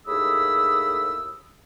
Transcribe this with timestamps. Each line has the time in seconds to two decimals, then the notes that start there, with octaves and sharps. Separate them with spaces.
0.07 D#2 A2 G#4 B5 D#6 E6